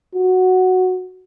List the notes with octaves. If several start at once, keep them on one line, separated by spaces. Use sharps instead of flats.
F#4